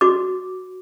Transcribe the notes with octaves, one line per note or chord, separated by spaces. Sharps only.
F#4 D6